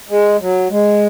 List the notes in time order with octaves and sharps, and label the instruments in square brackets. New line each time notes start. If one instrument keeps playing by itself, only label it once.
[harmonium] G#3
F#3
G#3